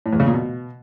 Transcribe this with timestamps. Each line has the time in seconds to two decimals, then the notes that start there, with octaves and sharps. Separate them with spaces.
0.06 A2
0.13 E2
0.20 C#3
0.27 A#2
0.34 B2